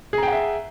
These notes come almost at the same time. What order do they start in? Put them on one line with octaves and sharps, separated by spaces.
G#4 A#5 G5 F#5 E5